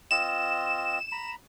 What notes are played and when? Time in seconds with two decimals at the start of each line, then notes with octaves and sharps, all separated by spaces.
0.11 C4 F4 D#5 E7
1.12 A#5 B5